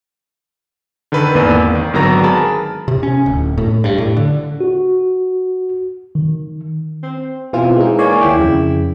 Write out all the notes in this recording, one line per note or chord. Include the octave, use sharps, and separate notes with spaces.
D3 D#3 A4 B4
G#1 E2 A#3 B4 D5 D#7
D#3
G#1 D3 F#3 B3 A#5 A#6
G#4 A#4 A5 B5 A6
C3
C#4
D1
A2
G2
A2
D3
F#4
D#3
C4
B2 E3 C4 F4
G#3 D#4
A#3 C#5 D5 G#5
D#2 E4 G5 D6
F2 C#3